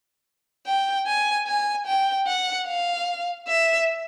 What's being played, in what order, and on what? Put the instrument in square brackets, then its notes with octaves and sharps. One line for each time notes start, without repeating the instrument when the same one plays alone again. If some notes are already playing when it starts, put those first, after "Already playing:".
[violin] G5
G#5
G#5
G5
F#5
F5
E5